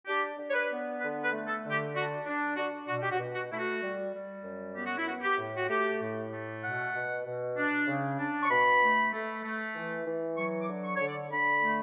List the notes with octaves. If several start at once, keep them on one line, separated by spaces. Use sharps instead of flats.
D4 G4
D4
C#5
B4
B3
D3 B4
B4
A3
A4
D3
G4
D4 F#4
D4
D4 F#4
B2 F#4
G4
F#4
B2
F#4
A3 E4
F#4
G3
G3
F#2
B3 G4
F#4
E4
B3 F#4
G4
A2
F#4
A3 G4
A2
A3
B2 F#5
B2
B2
D4
C#3
D4
C#6
B2 B5
A3
A3
A3
E3
E3
F#3 C#6
D6
D3
C#6
D3 C#5
D5
D3 B5
A3